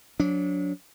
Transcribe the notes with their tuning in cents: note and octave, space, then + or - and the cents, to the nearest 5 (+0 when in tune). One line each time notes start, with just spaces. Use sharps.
F#3 -30 D4 -25